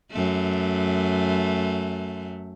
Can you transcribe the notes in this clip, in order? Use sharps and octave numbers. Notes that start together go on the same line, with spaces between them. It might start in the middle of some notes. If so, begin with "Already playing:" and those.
F#2 A3